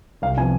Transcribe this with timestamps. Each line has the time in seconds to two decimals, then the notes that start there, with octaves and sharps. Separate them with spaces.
0.22 C2 F5
0.37 C3 F3 B3 G#5